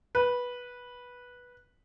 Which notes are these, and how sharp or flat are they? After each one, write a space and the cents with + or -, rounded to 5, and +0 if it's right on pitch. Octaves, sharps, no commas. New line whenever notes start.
B4 -10